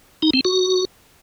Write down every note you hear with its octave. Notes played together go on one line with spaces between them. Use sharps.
D#4
C4
F#4